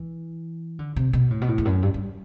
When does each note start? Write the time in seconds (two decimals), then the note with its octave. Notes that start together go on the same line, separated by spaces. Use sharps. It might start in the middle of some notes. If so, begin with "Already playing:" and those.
Already playing: E3
0.79 D3
0.96 C3
1.13 B2
1.31 A2
1.41 B2
1.48 A2
1.58 E2
1.65 F#2
1.83 G2
1.94 G2